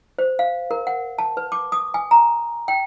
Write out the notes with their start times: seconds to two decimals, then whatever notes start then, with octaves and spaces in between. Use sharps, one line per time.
0.18 C5
0.39 F5
0.71 A#4
0.87 F#5
1.18 A5
1.37 B4
1.52 D6
1.72 D#6
1.94 G#5
2.11 A#5
2.68 G5